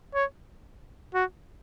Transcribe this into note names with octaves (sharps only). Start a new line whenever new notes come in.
C#5
F#4